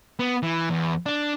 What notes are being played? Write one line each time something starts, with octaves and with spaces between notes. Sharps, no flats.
B3
E3
E2
D4